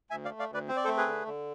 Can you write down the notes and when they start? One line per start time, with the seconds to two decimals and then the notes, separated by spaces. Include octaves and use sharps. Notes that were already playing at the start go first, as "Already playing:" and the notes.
0.10 D2 E5 G#5
0.25 D5 F5
0.30 A3
0.39 D5 F5
0.49 D2
0.54 B4 D5
0.68 C4 C5
0.77 D5
0.85 A4 C5
0.88 A3
0.97 G#4 B4
1.06 D3
1.26 D3